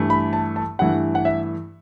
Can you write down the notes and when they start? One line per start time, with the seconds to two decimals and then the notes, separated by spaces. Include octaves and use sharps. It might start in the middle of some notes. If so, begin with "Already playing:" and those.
Already playing: G2 E3 A3
0.10 B5
0.33 A5
0.56 A5
0.79 G2 E3 A3 F#5
1.15 F#5
1.25 E5